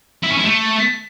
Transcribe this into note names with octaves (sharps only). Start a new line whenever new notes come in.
E4
C#4
E4
A3